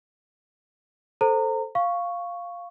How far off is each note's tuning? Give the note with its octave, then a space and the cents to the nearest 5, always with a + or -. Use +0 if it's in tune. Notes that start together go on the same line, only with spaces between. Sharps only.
A4 +0 C5 +0 A#5 -30
F5 +0 C#6 +0